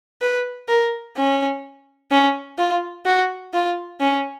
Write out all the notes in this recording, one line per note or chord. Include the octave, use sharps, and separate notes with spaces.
B4
A#4
C#4
C#4
F4
F#4
F4
C#4